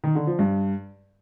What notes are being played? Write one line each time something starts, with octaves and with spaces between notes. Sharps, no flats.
D#3
D3
F3
G2